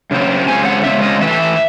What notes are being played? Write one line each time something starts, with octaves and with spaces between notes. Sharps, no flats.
F#2 C#3 C4
C#3 G#3 C4 G#5
F#5
C#3 G#3 C4 E5
D#5
A2 E3 C4 E5